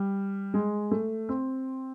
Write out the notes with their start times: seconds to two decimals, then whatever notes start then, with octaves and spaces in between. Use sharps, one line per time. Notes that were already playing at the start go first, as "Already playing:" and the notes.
Already playing: G3
0.54 G#3
0.91 A3
1.29 C4